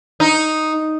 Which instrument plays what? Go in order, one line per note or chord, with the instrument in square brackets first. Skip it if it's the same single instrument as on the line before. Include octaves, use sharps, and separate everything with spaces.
[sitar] D#4